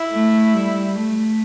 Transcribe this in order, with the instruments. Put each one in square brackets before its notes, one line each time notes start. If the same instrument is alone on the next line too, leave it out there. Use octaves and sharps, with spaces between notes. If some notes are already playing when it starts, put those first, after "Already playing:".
Already playing: [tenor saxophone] E4
[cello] A3
G3
A3